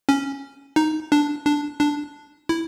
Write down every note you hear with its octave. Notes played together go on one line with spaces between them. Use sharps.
C#4
D#4
D4
D4
D4
E4